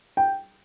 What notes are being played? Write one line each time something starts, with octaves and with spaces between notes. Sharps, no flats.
G5